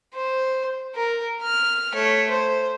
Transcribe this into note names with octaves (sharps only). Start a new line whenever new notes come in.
C5
A#4
F6
A3 C#5
C5